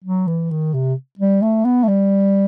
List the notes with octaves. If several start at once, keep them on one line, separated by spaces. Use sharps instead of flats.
F#3
E3
D#3
C3
G3
A3
B3
A3
G3